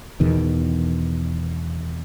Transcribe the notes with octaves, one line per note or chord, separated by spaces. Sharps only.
E2 B2 D#3